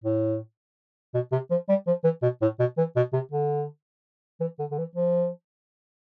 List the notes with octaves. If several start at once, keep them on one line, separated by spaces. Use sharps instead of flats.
A2
B2
C3
F3
G3
F3
E3
B2
A2
B2
E3
B2
C3
D3
E3
D3
D3
E3
F3